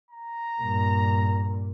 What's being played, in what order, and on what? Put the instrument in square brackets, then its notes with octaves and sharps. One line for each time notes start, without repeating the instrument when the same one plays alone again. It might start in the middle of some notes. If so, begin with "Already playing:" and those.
[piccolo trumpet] A#5
[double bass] G2 A#2